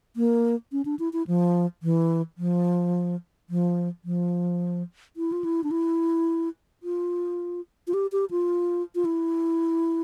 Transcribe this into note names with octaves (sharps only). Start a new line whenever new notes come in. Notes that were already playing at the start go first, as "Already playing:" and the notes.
A#3
C#4
D4
E4
E4
F3
E3
F3
F3
F3
E4
F4
E4
D4
E4
F4
F4
G4
G4
F4
F4
E4